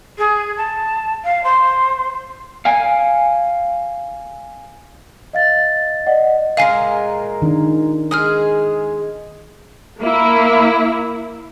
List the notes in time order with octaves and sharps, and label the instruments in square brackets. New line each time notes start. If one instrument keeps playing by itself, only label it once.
[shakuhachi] G#4
A5
F5
C5
[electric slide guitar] F5 G#5
[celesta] D#5 F5 A6
D5 D#5 F#5
[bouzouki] A#2 G#3 A#4 [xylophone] F5 G#5 C7
[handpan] D#3 D4
[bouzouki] G#3 G#4 [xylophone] D#6 F6
[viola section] A#3 E4